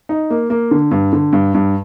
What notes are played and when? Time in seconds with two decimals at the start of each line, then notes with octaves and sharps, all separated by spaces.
0.09 D#4
0.30 A#3
0.50 A#3
0.71 D3
0.91 G2
1.13 D3
1.33 G2
1.54 G2